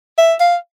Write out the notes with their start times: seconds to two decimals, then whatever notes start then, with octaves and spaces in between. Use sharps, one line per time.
0.18 E5
0.40 F5